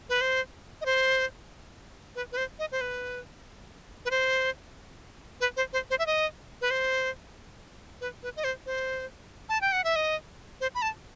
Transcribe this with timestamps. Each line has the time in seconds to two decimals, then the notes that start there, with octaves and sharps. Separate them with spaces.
0.09 B4
0.21 C5
0.81 D#5
0.86 C5
2.15 B4
2.32 B4
2.37 C5
2.59 D#5
2.72 C5
2.81 B4
4.05 B4
4.11 C5
5.41 B4
5.57 C5
5.73 C5
5.90 C5
5.99 E5
6.06 D#5
6.61 B4
6.71 C5
8.01 B4
8.23 B4
8.36 D#5
8.44 C5
8.66 C5
9.49 A5
9.61 G5
9.72 F#5
9.84 E5
9.96 D#5
10.61 C5
10.75 B5
10.82 A5